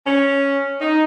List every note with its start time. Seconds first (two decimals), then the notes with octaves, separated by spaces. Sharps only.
0.07 C#4
0.81 D#4